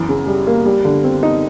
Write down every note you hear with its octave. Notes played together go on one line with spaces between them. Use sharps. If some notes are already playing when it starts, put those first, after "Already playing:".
Already playing: F#2 E3
C#3
G3
A#3
G3
D3
C4
D#4